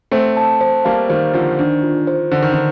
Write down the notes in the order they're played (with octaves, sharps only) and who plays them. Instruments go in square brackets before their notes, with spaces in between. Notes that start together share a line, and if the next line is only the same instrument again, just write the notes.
[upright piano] A3 C4 [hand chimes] C5
[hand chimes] A5
C5
[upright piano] G3 A#3 [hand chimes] F5
[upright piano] D#3 G3 [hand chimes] C5
[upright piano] D3 F3 [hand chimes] C5
[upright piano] D#3 [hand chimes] D4
[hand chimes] F4
C5
[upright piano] D3 [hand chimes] C5
[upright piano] D#3
D3